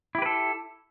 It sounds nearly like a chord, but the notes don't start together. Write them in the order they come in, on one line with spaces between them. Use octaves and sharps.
E4 G4 B4 A4